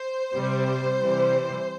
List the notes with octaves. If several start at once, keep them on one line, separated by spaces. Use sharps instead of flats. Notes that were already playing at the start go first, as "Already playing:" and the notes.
Already playing: C5
C3 G3
C3 E3 G3